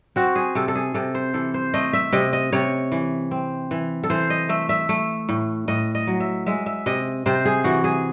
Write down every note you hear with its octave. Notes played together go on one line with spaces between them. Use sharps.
C4 F#4
G#4
C3 A4
A4
G#4
C3 A4
C5
E3 A4
C5
A3 D#5
E5
C3 D#5
D#5
C3 C#5
E3
C4
E3
A4
E3 C5
D#5
A3 E5
E5
A3
A2
A2 D#5
D#5
F#3
E5
G#3 E5
E5
C3 D#5
C3 C5
G#4
E3 F#4
G#4